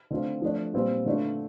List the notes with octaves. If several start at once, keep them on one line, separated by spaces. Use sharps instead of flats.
D3 A3 C4 F4
F3 A3 D4
A#2 G3 C4 F4
D3 A3 D4 F4